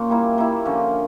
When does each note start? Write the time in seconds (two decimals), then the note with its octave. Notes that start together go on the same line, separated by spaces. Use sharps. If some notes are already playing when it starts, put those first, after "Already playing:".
Already playing: A#2 C#4 G4
0.09 G3 A#3 E4
0.38 G3 A#3 E4
0.65 D3 F3 C#4